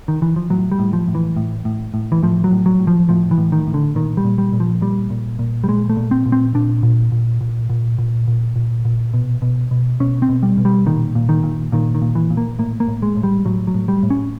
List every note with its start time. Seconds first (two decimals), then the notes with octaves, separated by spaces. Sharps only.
0.08 D#3
0.22 E3
0.36 F3
0.50 A2 F#3
0.72 G3
0.79 A2
0.93 F3
1.08 A2
1.15 E3
1.36 A2
1.65 A2
1.94 A2
2.12 E3
2.23 A2 F3
2.44 F#3
2.51 A2
2.66 F#3
2.80 A2
2.87 F3
3.09 A2 F3
3.31 E3
3.38 A2
3.52 D#3
3.67 A2
3.74 D3
3.95 A#2 D#3
4.17 G3
4.25 A#2
4.38 G3
4.53 A#2
4.60 F3
4.81 A#2 G3
5.10 A#2
5.39 A#2
5.64 G3
5.68 A#2 G#3
5.90 A3
5.97 A#2
6.11 C4
6.26 A#2
6.32 C4
6.55 A#2 D4
6.83 A#2
7.12 A#2
7.41 A#2
7.70 A#2
7.98 A#2
8.28 A#2
8.56 A#2
8.85 A#2
9.14 B2
9.42 B2
9.71 B2
10.00 B2 C#4
10.22 C4
10.29 B2
10.43 G3
10.58 B2
10.65 G3
10.86 A#2 D#3
11.15 A#2
11.29 D#3
11.43 A#2
11.72 A#2 D#3
11.95 D#3
12.02 A#2
12.15 E3
12.30 A#2
12.37 A#3
12.59 A2 A#3
12.80 A#3
12.88 A2
13.02 G#3
13.17 A2
13.24 G3
13.45 A2 F#3
13.67 F#3
13.74 A2
13.88 G3
14.03 A2
14.10 C#4